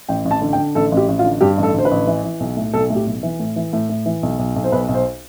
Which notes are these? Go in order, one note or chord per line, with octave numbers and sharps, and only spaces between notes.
A1 G5
A1
A5
D3
G5
D3
A1 A4
A1
G4
A1
F4
D3
G2 G4
A1
A4
D3 C5
B4
A1
E3
E3
B1
A2
B1 A4
A2
G4
B1
E3
A2
E3
A2
A2
E3
B1
B1
B1
C5
B1 B4
B1
C5